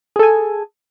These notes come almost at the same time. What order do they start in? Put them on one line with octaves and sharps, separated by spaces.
G#4 A4 G#5